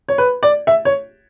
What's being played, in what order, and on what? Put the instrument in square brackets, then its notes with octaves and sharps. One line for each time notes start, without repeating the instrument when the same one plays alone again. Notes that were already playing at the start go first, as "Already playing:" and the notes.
[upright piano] C#5
B4
D5
E5
C#5